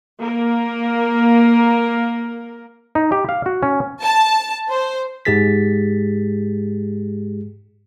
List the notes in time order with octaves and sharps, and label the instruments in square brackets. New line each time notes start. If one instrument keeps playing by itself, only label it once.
[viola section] A#3 A#4
[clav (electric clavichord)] D#4
G4
F5
F#4
C#4
[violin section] A5
C5
[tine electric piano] G#2 G#3 G4 G#4 A6 B6